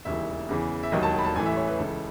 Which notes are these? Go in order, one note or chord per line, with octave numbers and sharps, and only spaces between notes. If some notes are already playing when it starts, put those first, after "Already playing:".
E1 D#2 C#3 E3 E5
E2 C#3 E3
E5
E1 D#2 D#3 F#3 D#5
A5
B5
A5
A1 A2 E3 G#5
E5
C#5
B4
C#2 C#3 E3 A4